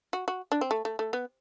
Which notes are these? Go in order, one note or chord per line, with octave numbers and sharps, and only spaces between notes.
F#4
F#4
D4
C4
A3
A3
A3
B3